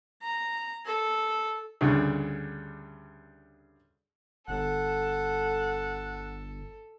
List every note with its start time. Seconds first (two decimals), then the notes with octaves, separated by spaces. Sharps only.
0.23 A#5
0.86 A4
1.81 D2 G2 C#3
4.48 G1 A4 F#5